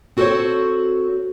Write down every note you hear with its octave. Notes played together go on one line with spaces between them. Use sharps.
C4 F#4 A4 A#4 C5 C#5